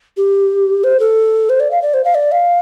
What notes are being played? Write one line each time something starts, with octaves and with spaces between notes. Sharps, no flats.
G4
C5
A4
C5
D5
F5
D5
C5
F5
D5
F5